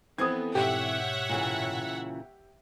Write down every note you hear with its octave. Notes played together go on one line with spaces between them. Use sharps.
E3 B3 C4 A4 D#6 G#6
G#2 B2 G4 C#5 E5 F#5
A#2 C#3 E3